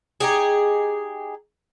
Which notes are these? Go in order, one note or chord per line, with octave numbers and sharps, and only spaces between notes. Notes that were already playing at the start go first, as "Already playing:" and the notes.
D#4 G4 G#4